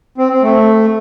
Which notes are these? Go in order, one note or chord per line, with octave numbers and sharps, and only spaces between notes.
C4
C4
A3